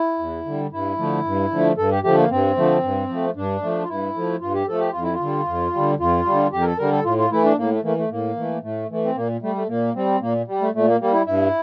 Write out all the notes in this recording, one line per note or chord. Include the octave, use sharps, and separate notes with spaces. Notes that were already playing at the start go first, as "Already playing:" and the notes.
Already playing: E4
E2
D3 G3
G2 E4
D3 F3 A3
G2
D3 F3 A3
G2 A4
G4
D3 F3 A3 G4
A#3
G2 C4
D3 F3 A3
G2
F3 A3
G2 D4
F3 A3
F4
G2 E4
F3 A3
G2 F4
G4
F3 A3 A4
G4
F2 F4
E4
F4
D3 G3
F2
D3 G3
F2 F4
D3 G3
F2 G4
A#4
A4
D3 G3 A#4
A4
A2 F4
F4
E3 A3 E4
D4
A2 A#3
A3
E3 A3 A#3
A3
A2 A#3
E3 A3
A2 A3
E3 A3
C4
A#2 A#3
G3 A3
A3
A#2 A#3
G3 C4
A#2 A#3
G3
A3
A#2 A3
A#3
G3 A#3
E4
G2 E4